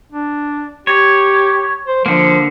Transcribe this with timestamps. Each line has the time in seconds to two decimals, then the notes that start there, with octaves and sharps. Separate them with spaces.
0.12 D4
0.87 G4 C#5
1.88 C5
2.06 D3 F3 A#3